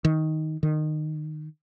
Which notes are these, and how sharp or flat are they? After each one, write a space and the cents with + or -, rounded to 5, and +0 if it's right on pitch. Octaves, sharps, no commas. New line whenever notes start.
D#3 +10
D#3 -20